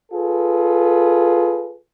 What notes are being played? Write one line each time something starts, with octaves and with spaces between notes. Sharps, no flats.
F4 G#4 A4 B4